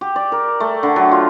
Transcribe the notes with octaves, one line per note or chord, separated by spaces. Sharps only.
G4
D5
A#4
A3
D3
F#3
F4